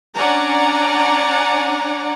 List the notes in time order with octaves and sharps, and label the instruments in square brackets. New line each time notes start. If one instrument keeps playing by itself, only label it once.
[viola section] C#4 D4 D5 F#5 G#5 A#5